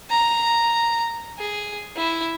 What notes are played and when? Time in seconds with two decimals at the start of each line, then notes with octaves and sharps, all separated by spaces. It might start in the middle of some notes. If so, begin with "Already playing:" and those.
0.10 A#5
1.39 G#4
1.97 E4